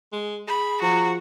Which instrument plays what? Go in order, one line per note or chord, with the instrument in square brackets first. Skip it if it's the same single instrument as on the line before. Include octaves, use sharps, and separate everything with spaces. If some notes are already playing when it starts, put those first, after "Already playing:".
[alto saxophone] G#3
[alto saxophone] G#4 [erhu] B5
[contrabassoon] F3 [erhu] F#4 [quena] A#5